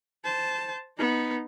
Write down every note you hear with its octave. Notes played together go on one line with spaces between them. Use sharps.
C5 A5
B3 D#4